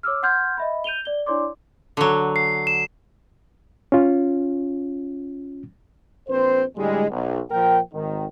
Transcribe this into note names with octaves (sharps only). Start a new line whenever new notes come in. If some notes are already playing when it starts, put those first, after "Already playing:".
C#5 D6 E6 F6
F#5 C6 F6 G6 G#6
D#5 E5 B5
G6 D#7 F7 G7
D5 G7
D4 E4 C#5 D5 C6 D6
D3 F#3
C7
E7
C#4 F4
A#1 C4 B4 C5
A2 D3 G3 G#3
B1
A#2 F3 A#4 G5
G#1 D#3